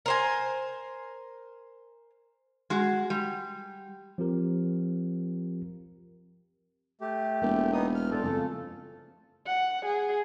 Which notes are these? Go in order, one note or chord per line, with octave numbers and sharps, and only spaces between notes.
A#4 C5 G#5
G#3 F#4
G3
F3 C4 F4 G4 A#4
A3 G4
E1 A#3
B3 D#4 D#6
F6
A3 D4 A4 C5
F2 C#3 A3 F4
F#5
G#4